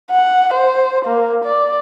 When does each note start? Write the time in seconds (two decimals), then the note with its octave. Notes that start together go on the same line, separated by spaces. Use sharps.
0.11 F#5
0.54 C5
1.05 A#3
1.44 D5